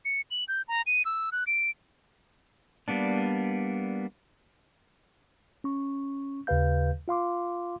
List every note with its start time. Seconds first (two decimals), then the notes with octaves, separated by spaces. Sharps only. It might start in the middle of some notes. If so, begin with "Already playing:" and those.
0.05 C#7
0.31 F#7
0.48 G6
0.68 A#5
0.87 D#7
1.05 E6
1.32 F#6
1.47 D7
2.88 G3 A#3 B3 D4
5.64 C#4 C#6
6.47 D#2 C#3 G4 B4 F5 G6
7.08 F4 F5 C6 D6